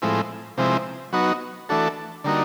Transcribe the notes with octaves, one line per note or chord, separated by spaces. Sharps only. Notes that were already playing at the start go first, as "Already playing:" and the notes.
A2 F3 G#3 C4 E4
C3 F3 G#3 C4 E4
F#3 B3 D#4 F#4
E3 A3 D4 F#4 A4
D3 G3 A#3 D#4 F#4